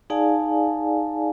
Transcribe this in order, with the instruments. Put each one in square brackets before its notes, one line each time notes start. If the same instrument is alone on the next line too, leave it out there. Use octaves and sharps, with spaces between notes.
[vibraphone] D#4 G#4 D5 F5 G#5 A5